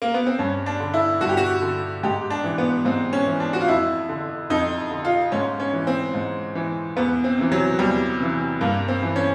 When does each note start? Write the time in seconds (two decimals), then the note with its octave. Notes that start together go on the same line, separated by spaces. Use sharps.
0.02 A#3
0.14 B3
0.26 C4
0.39 G2 C#4
0.66 D4
0.80 D3
0.94 E4
1.21 G2 F#4
1.29 G4
1.37 F#4
1.62 D3
2.03 G#2 G4
2.30 D4
2.44 E3
2.58 B3
2.85 G#2 C4
3.13 C#4
3.27 E3
3.40 D4
3.53 F#4
3.61 F4
3.68 F2 E4
4.09 D3
4.50 F2 D#4
4.91 D3
5.05 F4
5.32 G#2 C#4
5.60 C#4
5.73 E3
5.87 C4
6.14 G#2
6.55 E3
6.97 E2 B3
7.24 C4
7.38 C3 E3
7.52 F#3
7.79 E2 G3
8.20 C3 E3
8.61 G2 A#3
8.88 C4
9.02 E3
9.16 C#4